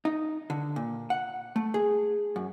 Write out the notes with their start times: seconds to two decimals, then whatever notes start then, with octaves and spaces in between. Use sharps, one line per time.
0.05 D#4
0.50 D3
0.76 A#2
1.10 F#5
1.56 A3
1.74 G#4
2.36 F#2